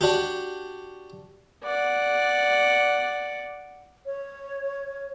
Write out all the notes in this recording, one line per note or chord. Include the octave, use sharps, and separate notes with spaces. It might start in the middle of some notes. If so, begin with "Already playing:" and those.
D4 F#4 G4
D5 F#5
C#5